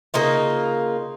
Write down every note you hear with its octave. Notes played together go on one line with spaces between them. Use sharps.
C#3 A#3 D#4 F4